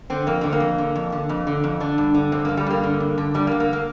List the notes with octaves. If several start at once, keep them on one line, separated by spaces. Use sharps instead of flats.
D3 C4
F2 A#3
D3 C4
A#3
F2
D3
F2
D3
F2
D3
F2
D3 D4
G2
D3
G2 C4
A#3
D3
G3
G2 A#3
D3
G2
D3
G2 G3
A#3
D3
A#3
A#3